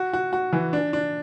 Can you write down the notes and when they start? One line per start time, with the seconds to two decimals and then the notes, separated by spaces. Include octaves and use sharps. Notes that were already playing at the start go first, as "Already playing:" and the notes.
Already playing: F#4
0.13 F#4
0.33 F#4
0.53 E3
0.73 D4
0.93 D4